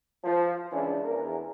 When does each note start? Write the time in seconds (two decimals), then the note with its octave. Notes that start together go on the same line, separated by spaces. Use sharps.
0.25 F3
0.72 C#2 C#3 E3 C#4 D4 E4
1.05 E2 A#4